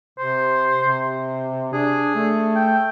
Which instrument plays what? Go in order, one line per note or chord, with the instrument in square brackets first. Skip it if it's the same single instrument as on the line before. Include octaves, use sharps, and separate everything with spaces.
[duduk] C3 [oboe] C5
[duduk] C3
[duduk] D4 [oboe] G#4
[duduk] A3
[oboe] G5